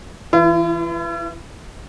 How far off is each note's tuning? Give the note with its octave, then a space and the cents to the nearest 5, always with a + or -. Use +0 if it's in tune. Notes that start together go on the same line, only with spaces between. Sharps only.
E3 +0 E4 +45